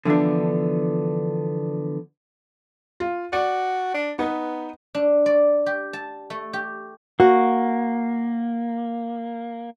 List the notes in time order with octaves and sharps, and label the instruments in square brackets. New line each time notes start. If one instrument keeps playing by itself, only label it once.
[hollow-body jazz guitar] D3 E3 F3 B3 D4
[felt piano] F4
[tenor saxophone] F#4 [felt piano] D5
[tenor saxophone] D4
[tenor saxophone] B3 [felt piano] D#4 B4
[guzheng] D4
D5
G4
A5
A3
G4
[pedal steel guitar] A#3 [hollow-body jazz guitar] F#4